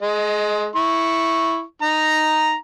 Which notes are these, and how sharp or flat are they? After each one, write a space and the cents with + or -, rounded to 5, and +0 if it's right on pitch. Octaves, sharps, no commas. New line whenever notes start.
G#3 +25 D#5 +0
E4 +0 C#6 -5
D#4 +0 A#5 +0